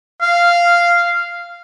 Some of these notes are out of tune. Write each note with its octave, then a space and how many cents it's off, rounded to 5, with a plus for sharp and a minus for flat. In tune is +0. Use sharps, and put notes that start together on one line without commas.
F5 -10